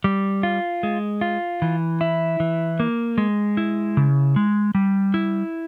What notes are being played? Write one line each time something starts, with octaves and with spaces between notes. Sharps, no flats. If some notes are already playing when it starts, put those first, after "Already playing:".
G3
F4
G#3
F4
E3
E4
E3
A#3
G#3
E4
C#3
G#3
G3
E4